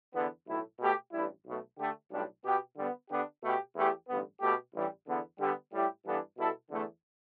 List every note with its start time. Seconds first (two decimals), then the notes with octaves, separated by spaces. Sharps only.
0.14 E2 D3 B3
0.47 B1 A2 A3 E4
0.79 B2 A3 G4
1.12 A1 G2 G3 E4
1.45 B1 B2 A3
1.78 D3 A3 G4
2.11 B1 A2 G3 D4
2.44 B2 B3 G4
2.76 D3 G3 B3
3.09 D3 B3 D4 G4
3.42 B2 A3 G4
3.76 E2 E3 A3 G4
4.08 A1 G2 D3 B3
4.41 B2 A3 G4
4.74 A1 G2 E3 G3
5.06 E2 D3 B3
5.39 D3 G3 B3 G4
5.73 A2 G3 E4 G4
6.05 G2 E3 B3 D4 A4
6.38 B2 G3 E4 A4
6.71 E2 D3 A3